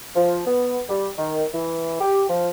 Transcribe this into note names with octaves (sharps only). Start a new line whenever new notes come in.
F3
B3
G3
D#3
E3
G4
F3